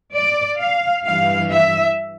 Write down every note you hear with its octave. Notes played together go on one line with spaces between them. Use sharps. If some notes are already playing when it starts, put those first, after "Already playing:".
D5
F5
G2 E3 G3 F5
E5